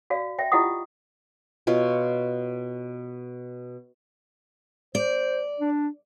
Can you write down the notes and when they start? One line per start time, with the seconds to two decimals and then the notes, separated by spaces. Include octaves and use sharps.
0.10 F#4 D5 F5
0.39 E5 G5
0.52 E4 F4 G4 D#5 F#5 D#6
1.67 B2 F4 C#5
4.95 C5 D5
5.60 D4